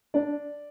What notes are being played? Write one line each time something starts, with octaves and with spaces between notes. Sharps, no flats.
D4 D5